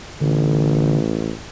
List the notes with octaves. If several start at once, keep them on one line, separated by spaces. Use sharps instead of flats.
A1 D3